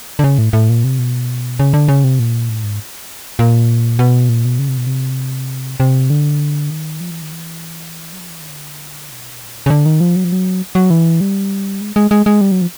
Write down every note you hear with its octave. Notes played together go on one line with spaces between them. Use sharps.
D3
C#3
A2
A2
A#2
C3
B2
C#3
D3
C#3
C3
A#2
A2
G#2
A#2
B2
A#2
B2
C#3
C3
B2
C3
C3
D3
D#3
F3
E3
D#3
E3
F#3
F3
E3
D#3
D3
B2
A#2
C#3
D3
D#3
F3
F#3
F3
F#3
F#3
E3
G3
G#3
G#3
G#3
G#3
G3
F#3
F3